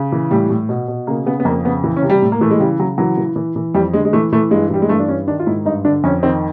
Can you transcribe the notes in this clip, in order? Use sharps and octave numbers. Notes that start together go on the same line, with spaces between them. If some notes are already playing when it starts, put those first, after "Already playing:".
Already playing: C#3
E3
A2 G3
A2
B2
B2
C#3 A#3
C#3 B3
B3
F2 A#3
C#3 B3
E3
C#4
C3
G3
A2
A#3
E3 A3
G#3
C#3 G3
C#3 F#3
E3 F#3
E3
E3
E3
F2 G3
D3 G#3
G#3
E3 A3
E3 A3
G2 G#3
E3 G3
G#3
G2 A3
D4
G2 C#4
D#3 D4
F4
G#2 E4
G2 D#4
D3 D4
F2 C#4
D#3 C4